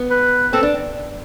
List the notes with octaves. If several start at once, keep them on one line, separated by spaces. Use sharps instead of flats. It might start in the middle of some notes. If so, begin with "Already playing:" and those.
Already playing: B3
B4
C4 A4
D4